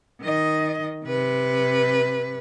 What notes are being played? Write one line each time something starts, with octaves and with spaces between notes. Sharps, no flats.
D#3 D#5
C3 B4